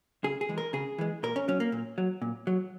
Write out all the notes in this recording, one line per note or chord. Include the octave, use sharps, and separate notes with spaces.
C#3 G#4
G#4
E3 G#3
A#4
C#3 G#4
E3 G#3
A#2 A#4
C#4
F#3 C#4
A#3
A#2
F#3
A#2
F#3